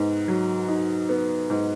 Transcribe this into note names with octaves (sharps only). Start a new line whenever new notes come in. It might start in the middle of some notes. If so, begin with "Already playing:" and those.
Already playing: G#2 B3 D#4
F#3
D#4
B3
G#2